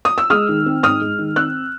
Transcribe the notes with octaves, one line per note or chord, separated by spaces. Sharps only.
D#6
E6
G#3 D#6 F6
D#3
C4
G#2 D#6 F6
G#3
D#3
C4 E6 F#6